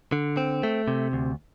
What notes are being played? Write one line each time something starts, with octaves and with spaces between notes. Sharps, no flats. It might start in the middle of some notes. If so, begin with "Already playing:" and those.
D3
C4
A3
C3
D2